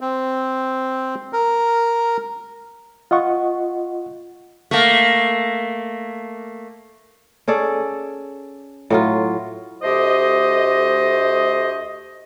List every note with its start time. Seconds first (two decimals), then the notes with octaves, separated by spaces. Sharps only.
0.01 C4
1.33 A#4
3.11 F4 D#5 F#5 C#6
4.71 A3 A#3
7.48 C#4 G#4 A4 D5
8.90 A2 F#3 F4
9.83 D2 A3 G4 C5 D#5